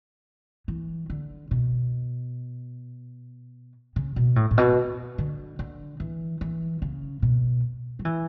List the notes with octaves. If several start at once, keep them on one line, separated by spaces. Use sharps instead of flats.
E3
D3
B2
C#3
B2
A2
A2
B2
D3
D3
E3
E3
C#3
B2
F#3
E3